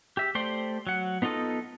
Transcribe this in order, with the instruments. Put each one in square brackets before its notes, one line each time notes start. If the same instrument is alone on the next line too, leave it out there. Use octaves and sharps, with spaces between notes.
[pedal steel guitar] G4 E5
A3 G4 C5 D5 C6
F#3 F#5
B3 D#4 F4 A4 D#5